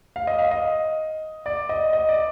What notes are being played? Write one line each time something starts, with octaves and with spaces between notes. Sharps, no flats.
F5
D#5
F5
D#5
D5
D#5
D#5
D5